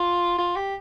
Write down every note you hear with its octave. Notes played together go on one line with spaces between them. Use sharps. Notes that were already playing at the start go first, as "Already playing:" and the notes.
Already playing: F4
F4
G4